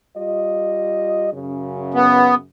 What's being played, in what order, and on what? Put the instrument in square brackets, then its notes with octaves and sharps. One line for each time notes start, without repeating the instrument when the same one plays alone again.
[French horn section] G3 F4 D#5
F#2 C#3
[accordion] B3